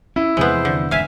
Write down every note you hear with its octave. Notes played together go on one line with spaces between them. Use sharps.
C#4 E4
E2 C3 F3 G#3 B3 C5
D3
E1 G#2 E3 E5 F5 G#5